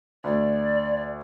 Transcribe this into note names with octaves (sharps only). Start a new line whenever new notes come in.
D2 D5